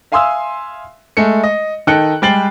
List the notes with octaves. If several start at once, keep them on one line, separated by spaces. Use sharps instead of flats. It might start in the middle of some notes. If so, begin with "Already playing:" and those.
E5 F5 G#5 C6 D#6 E6
G#3 A3 C#7
D#5
D#3 D#4 A4 G5 F#6 C#7
G3 G#3 G5 A6 C7 F#7